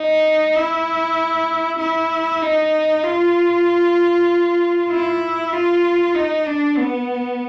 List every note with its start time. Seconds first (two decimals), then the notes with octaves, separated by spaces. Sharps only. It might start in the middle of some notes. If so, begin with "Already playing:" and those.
Already playing: D#4
0.56 E4
1.79 E4
2.42 D#4
3.04 F4
4.90 E4
5.52 F4
6.15 D#4
6.46 D4
6.77 B3